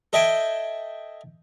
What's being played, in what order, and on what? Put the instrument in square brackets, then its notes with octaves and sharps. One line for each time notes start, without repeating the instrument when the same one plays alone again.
[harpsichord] A4 D#5 E5 G5 G#5